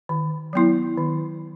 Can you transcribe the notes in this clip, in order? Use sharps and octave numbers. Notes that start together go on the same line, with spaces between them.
D#3
F#3 B3 E4
D#3